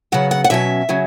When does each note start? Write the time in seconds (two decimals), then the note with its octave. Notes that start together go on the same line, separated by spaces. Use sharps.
0.12 C#3 F#3 B3 F#5
0.31 F#5
0.44 F#5
0.50 B2 F#3 C#4 E5
0.89 C#3 F#3 C#4